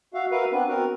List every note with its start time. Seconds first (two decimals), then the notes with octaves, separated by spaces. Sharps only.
0.14 F#4 E5 F5
0.31 F#4 A#4 B4 E5 F5
0.52 B3 C4 D4 B4
0.68 B3 C4 F#4 A#4